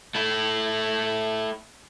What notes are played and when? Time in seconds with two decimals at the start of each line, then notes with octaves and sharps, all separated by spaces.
0.15 A3 E4